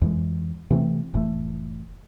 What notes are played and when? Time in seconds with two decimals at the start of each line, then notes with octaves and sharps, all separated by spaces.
0.02 F2 E3 G#3
0.70 C3 E3 A3 C4
1.14 F1 A2 E3 A3